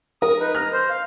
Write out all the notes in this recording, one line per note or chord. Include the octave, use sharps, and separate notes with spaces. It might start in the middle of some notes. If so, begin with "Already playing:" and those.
A#4 D#6
D#4 B4
A#5 F6
C5
F5